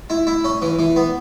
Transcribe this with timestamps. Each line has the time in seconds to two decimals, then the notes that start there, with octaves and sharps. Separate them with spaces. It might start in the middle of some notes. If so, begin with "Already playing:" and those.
0.10 E4
0.27 E4
0.44 C#4
0.62 E3
0.79 E3
0.96 B3